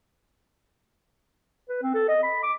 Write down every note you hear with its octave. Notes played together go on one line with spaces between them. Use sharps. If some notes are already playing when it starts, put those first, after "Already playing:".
B4
C4
A4
D#5
B5
D6